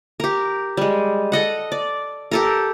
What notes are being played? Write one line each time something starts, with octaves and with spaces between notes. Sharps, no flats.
G4 A#4
G3 G#3
A4 D#5 F#5
D5
G4 A4 A#4